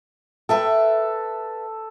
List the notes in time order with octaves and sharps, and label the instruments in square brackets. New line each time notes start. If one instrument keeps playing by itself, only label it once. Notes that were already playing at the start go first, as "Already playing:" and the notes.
[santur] A4 [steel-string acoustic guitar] B4 E5 G5